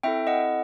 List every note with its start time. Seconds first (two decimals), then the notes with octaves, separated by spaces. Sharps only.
0.03 C4 E4 A4 E5 G5
0.27 D#5 F#5